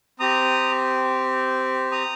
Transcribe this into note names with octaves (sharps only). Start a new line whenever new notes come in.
C4 G4 A#5 D#6
A#5 D#6